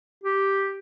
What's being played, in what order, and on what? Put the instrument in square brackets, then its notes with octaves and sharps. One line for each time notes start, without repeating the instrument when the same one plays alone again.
[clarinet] G4